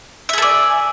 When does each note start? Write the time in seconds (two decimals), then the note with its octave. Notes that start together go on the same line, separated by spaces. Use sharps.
0.29 E5
0.33 G#4
0.38 A4
0.42 D5